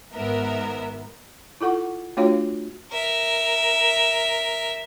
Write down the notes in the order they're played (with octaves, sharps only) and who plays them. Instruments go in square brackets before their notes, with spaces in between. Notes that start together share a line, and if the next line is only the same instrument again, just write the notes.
[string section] G#1 G#2 B3 A#4 E5
[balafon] E4 F4 A4 F#5 C#6
A3 D4 F4 F#4 C#5 F5
[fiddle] A#4 E5